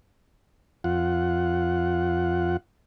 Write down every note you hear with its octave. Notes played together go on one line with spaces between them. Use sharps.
F2 F4 F#5